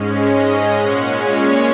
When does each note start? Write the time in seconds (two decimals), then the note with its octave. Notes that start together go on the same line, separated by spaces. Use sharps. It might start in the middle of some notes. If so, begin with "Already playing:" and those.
Already playing: G#2 G#3 C#4
0.18 D#5
0.75 A#2 G#3 C#4 F#5
1.05 C#5